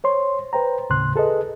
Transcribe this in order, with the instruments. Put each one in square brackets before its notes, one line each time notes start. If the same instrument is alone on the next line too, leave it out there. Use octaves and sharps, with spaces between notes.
[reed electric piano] C5 C#5 C6
B4 C5 G5 A#5
D#2 A2 C#3 C6 F#6
G#4 A4 B4 D#5